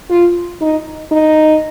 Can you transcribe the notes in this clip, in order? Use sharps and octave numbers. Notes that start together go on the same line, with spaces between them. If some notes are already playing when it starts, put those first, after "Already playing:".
F4
D#4
D#4